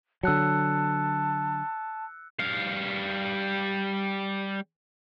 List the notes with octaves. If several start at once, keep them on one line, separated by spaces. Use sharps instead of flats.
D3 F#3 A5 E6 F#6 C#7
G3 F5